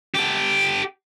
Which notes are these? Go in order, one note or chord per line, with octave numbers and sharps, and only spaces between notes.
G4 A4